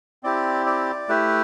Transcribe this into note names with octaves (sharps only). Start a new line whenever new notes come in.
C4 E4 G4 D5
D5
A3 E4 G4 B4